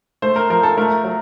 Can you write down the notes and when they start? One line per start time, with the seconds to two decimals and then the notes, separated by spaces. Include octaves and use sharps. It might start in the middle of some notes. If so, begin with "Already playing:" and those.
0.22 A3 C5
0.36 A#4
0.50 F3 A#4
0.63 A4
0.77 A3 A#4
1.04 F#3